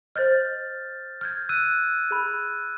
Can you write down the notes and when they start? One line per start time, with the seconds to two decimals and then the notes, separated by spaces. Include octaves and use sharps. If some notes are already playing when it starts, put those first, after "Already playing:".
0.16 C5 D#5 F6 G6 A6
1.21 F6 G6 G#6
1.49 E6 F#6 D#7
2.11 G#4 B5